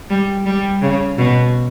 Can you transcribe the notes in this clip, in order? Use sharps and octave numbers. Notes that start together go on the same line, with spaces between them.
G3
G3
C#3
B2